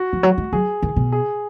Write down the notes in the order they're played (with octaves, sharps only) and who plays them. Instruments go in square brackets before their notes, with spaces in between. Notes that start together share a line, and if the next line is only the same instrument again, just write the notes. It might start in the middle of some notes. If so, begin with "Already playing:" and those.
Already playing: [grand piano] F#4
[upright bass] F3
F#3
G#3
[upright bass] F#3 [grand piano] G#4
[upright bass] D#3
B2
[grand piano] G#4